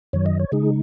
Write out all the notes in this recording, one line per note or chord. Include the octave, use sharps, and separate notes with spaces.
F#2 D#3 F#3 C#5
D#5
C#5
C#3 G#3 D#4 G#4